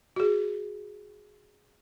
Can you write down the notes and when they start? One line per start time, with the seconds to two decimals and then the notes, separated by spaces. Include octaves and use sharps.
0.16 F#4 G#4